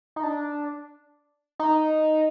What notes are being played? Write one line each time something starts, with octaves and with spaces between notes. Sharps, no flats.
D#4
D4
D#4